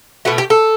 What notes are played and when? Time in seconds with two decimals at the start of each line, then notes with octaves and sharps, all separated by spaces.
0.25 B2 A3 F#4
0.38 G4
0.50 A4